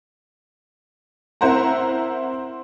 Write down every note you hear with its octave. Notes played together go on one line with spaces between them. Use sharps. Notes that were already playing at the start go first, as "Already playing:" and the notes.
C4 E4 A#4 C5 F#5 A#5